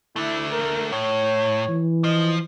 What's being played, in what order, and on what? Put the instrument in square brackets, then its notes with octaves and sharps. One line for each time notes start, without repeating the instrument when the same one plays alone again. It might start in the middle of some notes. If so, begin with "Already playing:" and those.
[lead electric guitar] D3 A3 [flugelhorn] E4
[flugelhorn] A#4
[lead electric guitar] A2 [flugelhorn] C#5
[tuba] E3
[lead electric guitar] F3 [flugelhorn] D#5